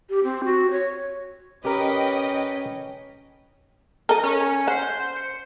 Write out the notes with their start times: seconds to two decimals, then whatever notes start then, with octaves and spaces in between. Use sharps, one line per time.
0.10 G4
0.24 C4
0.44 F#4
0.71 C#5
1.65 C#4 G4 A#4 B4 D#5 G5
4.09 A4 A#4 D#5
4.24 C#4
4.68 C5 F#5
5.17 C#7